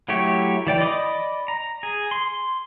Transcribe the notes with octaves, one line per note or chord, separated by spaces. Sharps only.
F#3 A3 E4 G4 C#5
E3 D5 G5
D5 D#5 B5 D6 D#6
A#5
G#4
C6